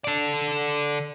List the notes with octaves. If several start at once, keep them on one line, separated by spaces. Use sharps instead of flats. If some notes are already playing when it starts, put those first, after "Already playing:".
A4 D5